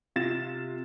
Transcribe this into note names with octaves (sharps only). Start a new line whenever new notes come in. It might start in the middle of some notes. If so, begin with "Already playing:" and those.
C3 F4 A6 E7